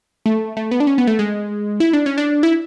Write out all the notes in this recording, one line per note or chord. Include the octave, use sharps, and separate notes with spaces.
A3
A3
B3
D4
C#4
B3
A3
G#3
E4
D4
C#4
D4
E4